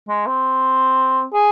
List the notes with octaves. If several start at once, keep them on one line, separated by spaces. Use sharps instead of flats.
G#3
C4
G#4